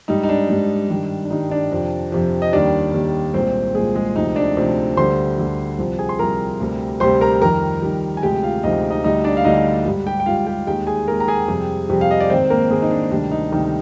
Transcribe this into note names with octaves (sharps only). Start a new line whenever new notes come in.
G#2 G3 D#4
D#4
D4
G#2 G3
G2 D#3 G3
D4
G2 D#3 G3 D#4
D4 D5
F2 C3 F3
F2 C3 F3
D#5
D#2 D#3 G3 D4 D5
D#2 D#3 G3
C2 A#2 G#3 C4 C5
C2 A#2 G#3 G#4
G#3 G#4
D2 C3 F3 D#4
D4 D5
D2 C3 F3
D2 D3 G3 C5 C6
D2 D3 G3
C2 C3 F3
G#4 G#5
C6
C2 C3 F3 A#4 A#5
D2 C3 G3
D2 C3 G3 C5 C6
A#4 A#5
F2 D#3 G3 A#4 A#5
F2 D#3 G3
G#5
D2 C3 F3 G#3 G4 G5
F4 F5
D2 C3 F3 G#3 D#4 D#5
D#4 D#5
D2 D3 G3 D#4 D#5
D4 D5
F5
D2 D3 G3 D#4 D#5
G#2 G3
G4 G5
G5
G#2 G3 F4 F5
F5
G4 G5
D#2 D#3 G#3 G4 G5
G#4 G#5
D#2 D#3 G#3 A#4 A#5
A#5
G#4 G#5
F2 C3 G3
F2 C3 G3
F5
D#5
D5
G#2 D#3 G#3 C4 C5
A#3 A#4
G#2 D#3 G#3 G#4
D#4
D4
D2 C3 D#3 G3 D4
D#4
D2 C3 D#3 G3 D#4